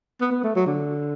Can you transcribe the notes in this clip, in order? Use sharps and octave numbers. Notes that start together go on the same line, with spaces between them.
B3
B3
A3
F#3
D3